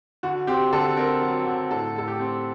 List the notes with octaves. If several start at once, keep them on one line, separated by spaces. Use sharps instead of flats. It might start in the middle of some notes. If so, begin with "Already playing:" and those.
D3 F#4
C4 G4
D3 A4
C4 A#4
F#3
D3
A2 A4
A2 A4
G4
C4